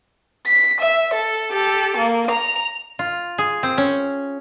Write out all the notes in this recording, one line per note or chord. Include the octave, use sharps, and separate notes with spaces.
B6
E5
A4
G4 A4
A#3
A#5 F7
F4
G#4
C4
C#4